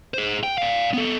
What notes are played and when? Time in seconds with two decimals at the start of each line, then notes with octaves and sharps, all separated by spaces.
0.14 G#4 C5
0.43 G5
0.58 D5 F5
0.94 B3 A4